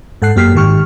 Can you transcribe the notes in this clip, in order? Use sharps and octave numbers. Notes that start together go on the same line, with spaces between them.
G#2 A4 F#5 F#6 C7
F#2 A#3 G4 F6 B6 C7
G#2 D#3 G4 C#6 F6